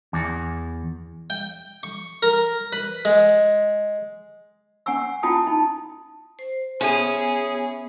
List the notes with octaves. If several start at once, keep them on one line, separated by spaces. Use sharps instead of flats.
E2
G5
C#6
A#4
B4
G#3
C#4 F#5 G#5 C#6 E6
C#4 E4 F4 G5 A5 D#6
D#4 A5
C5
B3 C#4 G#4 E5